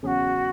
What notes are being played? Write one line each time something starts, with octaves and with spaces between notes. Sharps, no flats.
E2 C#3 F#3 C#4 F#4 G#4